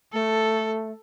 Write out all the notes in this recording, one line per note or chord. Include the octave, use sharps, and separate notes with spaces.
A3 A4